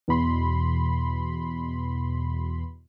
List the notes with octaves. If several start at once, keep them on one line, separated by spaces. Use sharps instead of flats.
E2 B2 B5 C6